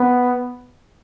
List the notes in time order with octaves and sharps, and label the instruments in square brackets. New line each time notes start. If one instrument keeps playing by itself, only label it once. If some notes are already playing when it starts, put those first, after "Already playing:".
Already playing: [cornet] B3